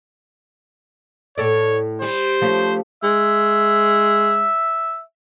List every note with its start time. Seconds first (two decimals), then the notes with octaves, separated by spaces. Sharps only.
1.38 A2 A4 C#5 D5
2.02 G3 C5
2.42 F3 A3 C#4
3.04 G#3 E5